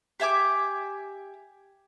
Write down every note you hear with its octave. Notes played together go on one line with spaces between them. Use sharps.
G4 E5 G#5 D6